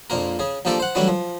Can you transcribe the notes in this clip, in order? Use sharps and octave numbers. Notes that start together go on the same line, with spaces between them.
A#1 F2 A#2 A#3 A#4
C#3 G#4
A#1 F3 A#3 G4 A4 D5
C5 F#5
E3 F#3 G3 A3 D4 E4
F3